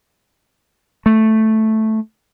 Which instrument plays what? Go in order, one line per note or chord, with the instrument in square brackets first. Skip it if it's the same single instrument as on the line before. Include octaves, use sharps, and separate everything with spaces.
[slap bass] A3